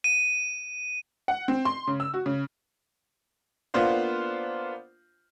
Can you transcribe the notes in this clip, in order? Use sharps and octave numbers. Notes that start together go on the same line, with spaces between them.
D#7
F#5
C4
C6
C#3
E6
F#4
C#3
A#3 B3 D4 F4 C5 F5